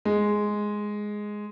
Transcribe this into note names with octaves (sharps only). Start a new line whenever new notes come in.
G#3